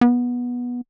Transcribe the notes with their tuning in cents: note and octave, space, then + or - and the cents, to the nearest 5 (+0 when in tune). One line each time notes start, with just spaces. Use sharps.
B3 -15